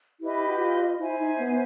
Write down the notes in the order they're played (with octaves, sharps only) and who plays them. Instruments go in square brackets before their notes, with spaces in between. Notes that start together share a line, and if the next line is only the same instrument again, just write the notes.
[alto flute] E4 [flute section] G4 B4 D#5
[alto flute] F#4
F4
[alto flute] E4 [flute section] C5 E5 G#5
[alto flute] E4
D#4
B3